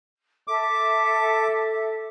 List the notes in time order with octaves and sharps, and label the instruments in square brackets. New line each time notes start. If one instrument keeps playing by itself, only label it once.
[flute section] A4 E5 [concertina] D6